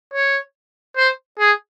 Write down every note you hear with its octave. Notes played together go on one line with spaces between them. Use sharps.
C#5
C5
G#4